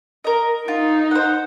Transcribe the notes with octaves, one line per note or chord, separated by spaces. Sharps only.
A#4 D#5
D#4 F4
C5 F#5